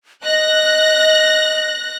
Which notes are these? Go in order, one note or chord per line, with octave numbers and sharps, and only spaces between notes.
D#5 F#6 A#6